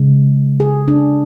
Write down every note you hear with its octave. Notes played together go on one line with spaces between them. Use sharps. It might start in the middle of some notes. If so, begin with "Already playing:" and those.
Already playing: C#3 G#3
G#4
D4